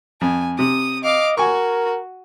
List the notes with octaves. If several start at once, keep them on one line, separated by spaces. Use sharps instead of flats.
F2 G#5
C3 D#6
D#5 F5 D6
F#4 A#4 G#5 C#6